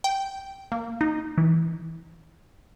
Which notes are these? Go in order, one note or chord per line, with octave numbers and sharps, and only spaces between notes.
G5
A#3
D#4
E3